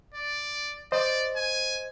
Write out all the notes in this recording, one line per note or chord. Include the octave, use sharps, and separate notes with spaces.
D5
C5 D5 D#5
G#5